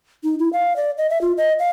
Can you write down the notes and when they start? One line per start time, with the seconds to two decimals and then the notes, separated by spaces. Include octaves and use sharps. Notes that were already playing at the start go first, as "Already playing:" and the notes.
0.24 D#4
0.39 E4
0.53 F5
0.76 D5
0.98 D#5
1.10 E5
1.21 F4
1.37 D#5
1.59 F5